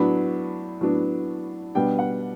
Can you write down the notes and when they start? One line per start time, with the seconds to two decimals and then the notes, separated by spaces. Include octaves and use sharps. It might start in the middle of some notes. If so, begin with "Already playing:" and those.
Already playing: A2 F#3 B3 D4 B5
0.81 A2 F#3 B3 D4
1.75 B2 G3 B3 D4 G5
1.99 F#5